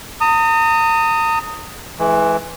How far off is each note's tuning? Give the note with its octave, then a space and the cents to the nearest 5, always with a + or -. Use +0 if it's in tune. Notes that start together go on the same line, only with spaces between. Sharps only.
A#5 -40 D#6 +0
E3 +0 G#3 +35